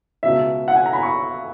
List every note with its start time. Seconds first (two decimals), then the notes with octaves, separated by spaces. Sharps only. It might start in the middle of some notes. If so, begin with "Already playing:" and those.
0.23 C#2 B2 E5
0.68 F#5
0.76 G#5
0.86 A#5
0.93 B5
1.03 C#6